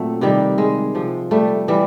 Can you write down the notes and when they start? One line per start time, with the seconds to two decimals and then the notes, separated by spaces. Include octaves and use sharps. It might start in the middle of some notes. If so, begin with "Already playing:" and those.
Already playing: A#2 F#3 A3 C4
0.21 C3 D#3 G3
0.58 G#3
0.95 C3 F3
1.31 G3 A3
1.68 E3 G3